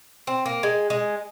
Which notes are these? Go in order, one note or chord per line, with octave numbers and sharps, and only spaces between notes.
C4
A#3
G#3
G#3